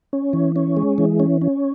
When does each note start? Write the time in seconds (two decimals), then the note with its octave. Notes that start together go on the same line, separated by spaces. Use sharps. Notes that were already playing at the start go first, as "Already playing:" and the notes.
0.13 C#4
0.33 E3
0.56 C#4
0.77 G#3
0.98 E3
1.20 C#4
1.41 C#4